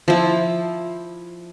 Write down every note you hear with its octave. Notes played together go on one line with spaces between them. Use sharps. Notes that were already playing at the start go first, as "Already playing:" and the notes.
F3 E4